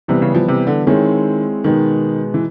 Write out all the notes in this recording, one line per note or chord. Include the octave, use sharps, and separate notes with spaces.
C3 E3 G3 B3
C#3
F3
C3
D3
D#3 G#3 C4 E4 G#4 C#5
B2 D#3 G#3 B3 D#4
E3